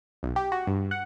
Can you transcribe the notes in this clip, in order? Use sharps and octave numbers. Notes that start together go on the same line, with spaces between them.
B1
G4
F#4
G2
F#5